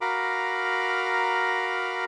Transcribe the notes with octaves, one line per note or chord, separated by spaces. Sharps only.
F#4 A#4 F5 A#5 B5 D6